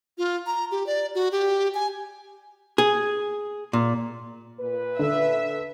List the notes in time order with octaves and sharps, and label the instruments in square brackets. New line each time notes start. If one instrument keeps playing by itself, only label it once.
[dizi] F4
A#5
G4
D5
F#4
G4
G#5
[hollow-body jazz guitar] G#4
A#2
[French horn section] A#2 B4
[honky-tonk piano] D3 [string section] E5